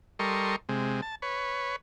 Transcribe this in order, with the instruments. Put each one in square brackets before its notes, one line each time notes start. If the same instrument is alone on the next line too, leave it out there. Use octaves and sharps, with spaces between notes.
[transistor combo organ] G3 A4 A#4 D#5 C6 C#6
C3 G#3
A5
B4 C#5